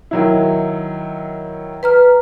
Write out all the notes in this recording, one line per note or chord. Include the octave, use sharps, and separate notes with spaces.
D#3 F#3 E4
B4 A#5 F6